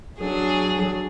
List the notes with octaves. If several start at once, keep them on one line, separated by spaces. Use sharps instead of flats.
F#3 D4 G#4